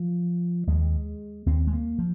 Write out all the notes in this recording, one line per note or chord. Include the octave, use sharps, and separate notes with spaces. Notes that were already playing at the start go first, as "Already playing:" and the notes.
Already playing: F3
D#2 G#3
D#2 C4
G#3
A#3
F3